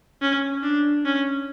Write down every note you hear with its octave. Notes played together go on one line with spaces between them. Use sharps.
C#4
D4
C#4